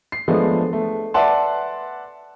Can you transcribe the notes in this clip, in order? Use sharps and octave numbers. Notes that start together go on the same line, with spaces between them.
C7
F3 G#3 A3 B3 D4
A3
B4 D5 E5 F#5 A5 C6